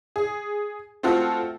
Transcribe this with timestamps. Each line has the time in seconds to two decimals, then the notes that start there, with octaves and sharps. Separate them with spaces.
0.16 G#4
1.03 A3 C4 F4 F#4 A4